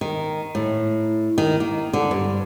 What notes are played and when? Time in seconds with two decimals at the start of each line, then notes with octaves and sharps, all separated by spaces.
0.01 D#3
0.55 A2
1.38 D#3
1.60 A#3
1.93 D3
2.11 G2